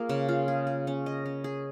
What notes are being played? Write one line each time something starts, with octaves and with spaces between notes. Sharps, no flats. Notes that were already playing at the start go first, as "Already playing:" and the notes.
Already playing: A#3 F4 G#4
C#3
F4
G#4
G#4
C#4
D#5
C#4
G#4